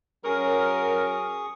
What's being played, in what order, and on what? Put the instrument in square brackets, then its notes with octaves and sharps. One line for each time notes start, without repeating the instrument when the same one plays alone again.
[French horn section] F#3 C#4 [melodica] G#4 C#6 D#6 [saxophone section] A#4